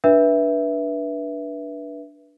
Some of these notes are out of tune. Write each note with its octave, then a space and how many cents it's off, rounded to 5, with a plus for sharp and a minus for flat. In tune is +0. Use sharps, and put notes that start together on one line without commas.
D4 +0 B4 -20 E5 +0